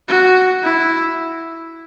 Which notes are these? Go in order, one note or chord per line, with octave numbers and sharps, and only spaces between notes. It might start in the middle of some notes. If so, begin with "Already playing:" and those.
F#4
E4